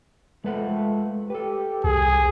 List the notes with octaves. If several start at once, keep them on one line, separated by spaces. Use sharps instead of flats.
F2 G#3 A3 B4 F#5
G4 A4 B4
C2 G#4